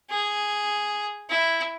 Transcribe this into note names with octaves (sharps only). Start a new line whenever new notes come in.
G#4
E4